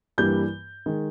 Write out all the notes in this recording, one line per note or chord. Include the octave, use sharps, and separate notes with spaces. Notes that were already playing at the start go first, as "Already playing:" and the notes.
G2 E3 G3 A#3 G6
D#3 G#3